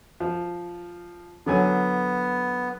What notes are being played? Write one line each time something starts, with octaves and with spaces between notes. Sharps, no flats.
F3
D3 F#3 B3 G#5